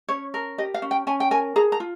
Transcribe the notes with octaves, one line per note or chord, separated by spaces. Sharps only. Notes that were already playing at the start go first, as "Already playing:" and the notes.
C#4 C#5
A#4
G4 D#5
F5
C#4
G5
C#4 G#5
G5
A#4 G#5
G#4 A#5
A#5
F4